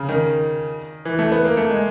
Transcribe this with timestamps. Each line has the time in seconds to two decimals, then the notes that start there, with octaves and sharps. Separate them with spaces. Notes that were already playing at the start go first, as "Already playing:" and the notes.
Already playing: C#3
0.09 D#3
1.05 E3
1.19 A3
1.32 B3
1.45 A#3
1.57 A3
1.70 G#3